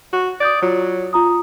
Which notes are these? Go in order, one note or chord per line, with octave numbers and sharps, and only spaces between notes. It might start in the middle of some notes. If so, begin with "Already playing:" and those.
F#4
D5 D#6 G6 A6
F#3 F4
F4 A#5 D#6